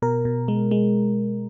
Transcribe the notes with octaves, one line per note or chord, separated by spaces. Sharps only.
B2 A#4
B2
G#3
G#3